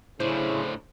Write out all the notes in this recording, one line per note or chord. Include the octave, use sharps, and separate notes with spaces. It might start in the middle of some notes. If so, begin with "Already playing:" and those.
A2 C#3 D4 E4 C5